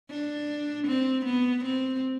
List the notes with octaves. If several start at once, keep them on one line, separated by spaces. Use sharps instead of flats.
D4
C4
B3
C4